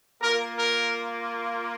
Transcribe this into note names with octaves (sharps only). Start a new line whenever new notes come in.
A#3 F4 A#4
A#4